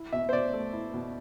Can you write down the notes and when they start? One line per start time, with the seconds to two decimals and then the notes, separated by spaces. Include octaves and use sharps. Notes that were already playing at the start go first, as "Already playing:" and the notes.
Already playing: E4
0.13 B2 E5
0.29 C5
0.33 B2 D5
0.53 A3
0.73 E4
0.94 B2